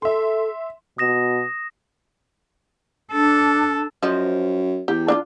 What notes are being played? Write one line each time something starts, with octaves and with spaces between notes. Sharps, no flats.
A4 E5 C6
B2 D#6 A#6 E7
D4 A4
F#2 F3 C5 D#5
E2 G4
D4 E4 F4